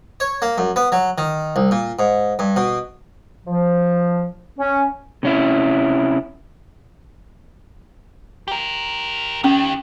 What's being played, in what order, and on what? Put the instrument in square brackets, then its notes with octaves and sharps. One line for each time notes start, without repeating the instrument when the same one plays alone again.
[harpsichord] C#5
A#3
F#2
B3
F#3
D#3
C2
A#2
G#2
G2
B2
[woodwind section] F3
C#4
[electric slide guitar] C3 C#4 E4
[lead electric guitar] G4 A#4
[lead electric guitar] D#3 G4 [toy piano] C#4